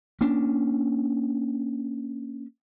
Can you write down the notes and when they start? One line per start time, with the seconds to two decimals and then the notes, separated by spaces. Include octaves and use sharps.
0.21 A#3 C#4 D4